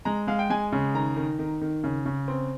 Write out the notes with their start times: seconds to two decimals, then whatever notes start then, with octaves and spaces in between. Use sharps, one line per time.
0.05 G#3 A#5
0.27 G#3 F5
0.39 G5
0.50 G#3 G#5
0.72 C#3
0.94 D#3 A#5
1.16 D#3
1.39 D#3
1.61 D#3
1.84 C#3
2.06 C#3
2.28 C4